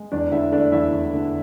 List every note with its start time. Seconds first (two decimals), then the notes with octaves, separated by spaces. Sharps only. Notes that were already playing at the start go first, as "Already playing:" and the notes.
Already playing: G#3
0.12 E2 D4 D5
0.32 D3 E4 E5
0.52 A3 D4 D5
0.72 E2 E4 E5
0.92 E2
1.13 D3